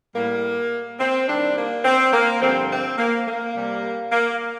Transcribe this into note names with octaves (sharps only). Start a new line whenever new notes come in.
A2 G3 A#3
C4
C3 D#3 G3 D4
A#3
C4
A#3
G2 D3 F3 C4
C4
A#3
A#3
C3 G3
A#3